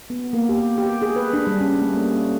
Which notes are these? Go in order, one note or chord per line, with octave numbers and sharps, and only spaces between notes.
B3
A#3
G4
G4
G#4
B4
D4
G3
C#4
A3
A#3